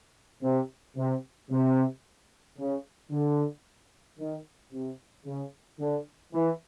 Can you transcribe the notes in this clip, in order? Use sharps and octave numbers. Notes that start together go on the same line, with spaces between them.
C3
C3
C3
C#3
D3
D#3
C3
C#3
D3
E3